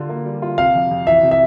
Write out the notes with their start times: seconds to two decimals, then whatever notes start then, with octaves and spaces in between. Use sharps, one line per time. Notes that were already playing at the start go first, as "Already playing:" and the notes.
Already playing: D3 G3 F4
0.09 A#3
0.25 G3
0.42 F4
0.58 C3 F5
0.75 F2
0.91 F2
1.07 E3 E5
1.23 C3
1.31 E5